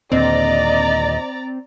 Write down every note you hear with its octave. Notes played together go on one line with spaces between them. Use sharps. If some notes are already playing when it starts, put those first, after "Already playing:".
D#2 A#2 D3 C4 D5 D#5 A#5 A6